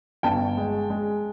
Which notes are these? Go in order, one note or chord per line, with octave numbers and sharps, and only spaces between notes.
G1 G5 A5
G#3
G#3